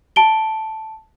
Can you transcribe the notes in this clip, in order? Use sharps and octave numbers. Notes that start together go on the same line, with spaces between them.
A5 D7 G7